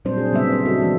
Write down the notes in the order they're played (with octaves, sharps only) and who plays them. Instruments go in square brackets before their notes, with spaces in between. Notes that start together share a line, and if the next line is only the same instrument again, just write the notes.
[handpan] A#2 F#3 G3 C4 D4 C5
G#4
C#3 G3 B3 C4 E5
C5
G3 D4 F#4 A4 D#5
E3 F3 G#3